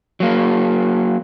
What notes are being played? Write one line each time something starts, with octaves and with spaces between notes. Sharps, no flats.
F#3 A#3